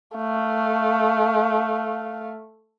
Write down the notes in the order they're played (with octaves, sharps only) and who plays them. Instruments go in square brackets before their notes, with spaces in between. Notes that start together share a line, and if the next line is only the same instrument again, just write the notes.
[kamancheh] A3 F5